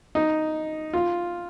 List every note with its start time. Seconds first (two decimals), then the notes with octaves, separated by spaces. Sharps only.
0.15 D#4
0.93 F4